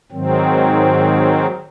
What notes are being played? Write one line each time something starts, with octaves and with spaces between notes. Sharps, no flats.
G#2 D#3 F#3 C4